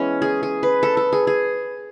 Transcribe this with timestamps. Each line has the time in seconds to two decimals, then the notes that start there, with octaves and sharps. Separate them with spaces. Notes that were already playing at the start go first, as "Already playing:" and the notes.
Already playing: E3 G#3 B3 C#4
0.22 G#4
0.43 G#4
0.63 B4
0.83 A4
0.97 A4
1.13 G#4
1.27 G#4